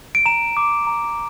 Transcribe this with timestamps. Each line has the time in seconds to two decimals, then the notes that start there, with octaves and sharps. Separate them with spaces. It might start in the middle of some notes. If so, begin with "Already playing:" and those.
0.15 D7
0.26 A#5 E7
0.57 D6
0.87 A#5